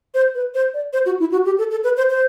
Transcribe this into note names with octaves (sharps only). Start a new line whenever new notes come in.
C5
B4
C5
D5
C5
F#4
E4
F#4
G4
A4
A4
B4
C5
C5